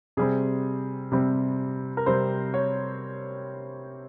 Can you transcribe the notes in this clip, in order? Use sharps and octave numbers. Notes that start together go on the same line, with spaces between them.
C3 G3 C4 G#4
C3 G3 C4
A#4
C3 G3 C4 C5
C#5